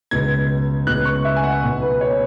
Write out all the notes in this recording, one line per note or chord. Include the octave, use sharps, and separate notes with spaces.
C#2 B2 B3 G#6
C#2 B2 B3 F#6
C#6
E5
G#5
F#5
B1 B2 B3
B4
C#5